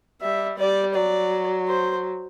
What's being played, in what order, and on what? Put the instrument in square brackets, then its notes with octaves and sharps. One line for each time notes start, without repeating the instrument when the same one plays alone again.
[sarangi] G3 [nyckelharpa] E5
[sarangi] G3 [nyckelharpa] D5
[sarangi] F#3 [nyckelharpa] D5
[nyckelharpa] C5